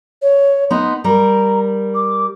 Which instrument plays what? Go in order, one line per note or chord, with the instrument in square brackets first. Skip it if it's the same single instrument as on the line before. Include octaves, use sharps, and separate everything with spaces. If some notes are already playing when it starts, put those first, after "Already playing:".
[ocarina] C#5
[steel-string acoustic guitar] B3 D#4 [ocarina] C6
[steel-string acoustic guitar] G3 A#4 [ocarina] A#5
[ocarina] D6